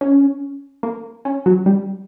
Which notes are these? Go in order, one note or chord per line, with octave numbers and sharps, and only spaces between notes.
C#4
A#3
C#4
F#3
G3